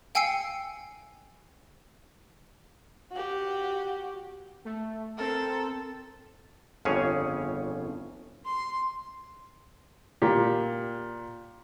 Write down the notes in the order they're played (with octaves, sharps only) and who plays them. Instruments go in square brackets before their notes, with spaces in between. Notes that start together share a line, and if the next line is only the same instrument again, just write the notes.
[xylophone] F5 G5 G#5 E6 C7 C#7
[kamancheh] F#4 G4
[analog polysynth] A3
[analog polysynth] C4 A#4 [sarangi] A4
[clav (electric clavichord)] G1 F2 C#3 C#4 G#4 C#5
[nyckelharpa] C6
[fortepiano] A#2 G4